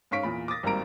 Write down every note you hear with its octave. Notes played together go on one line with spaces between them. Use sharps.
G#2 C#4 F5 C#6 B6 D7
E2 A#2 B5
D6 D#6 A6 A#6
G#1 G3 A#3 C4 A#5 D7